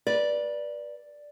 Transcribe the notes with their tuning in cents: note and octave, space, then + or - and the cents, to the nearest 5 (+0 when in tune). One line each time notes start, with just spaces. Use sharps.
B4 -30 D5 +0